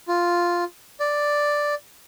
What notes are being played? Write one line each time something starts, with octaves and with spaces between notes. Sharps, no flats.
F4
D5